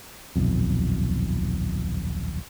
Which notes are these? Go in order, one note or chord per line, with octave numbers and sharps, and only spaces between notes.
D#1 B1 F2